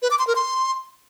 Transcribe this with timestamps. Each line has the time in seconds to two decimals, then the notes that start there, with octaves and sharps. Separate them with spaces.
0.02 B4
0.11 D6
0.19 C6
0.27 A#4
0.36 C6